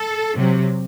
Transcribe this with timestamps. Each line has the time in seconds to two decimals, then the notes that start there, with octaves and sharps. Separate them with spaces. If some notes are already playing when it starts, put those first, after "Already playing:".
Already playing: A4
0.36 C3 F#3